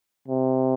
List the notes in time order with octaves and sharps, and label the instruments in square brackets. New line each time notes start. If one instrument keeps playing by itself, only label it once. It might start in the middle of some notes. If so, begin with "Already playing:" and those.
[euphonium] C3